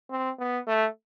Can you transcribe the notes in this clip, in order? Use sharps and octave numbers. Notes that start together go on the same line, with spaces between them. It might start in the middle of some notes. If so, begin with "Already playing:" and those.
C4
B3
A3